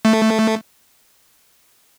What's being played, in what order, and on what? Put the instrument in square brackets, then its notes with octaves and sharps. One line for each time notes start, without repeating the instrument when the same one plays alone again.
[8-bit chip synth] A3